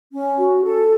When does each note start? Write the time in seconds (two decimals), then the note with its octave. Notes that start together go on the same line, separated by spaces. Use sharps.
0.12 C#4
0.37 F#4
0.63 A4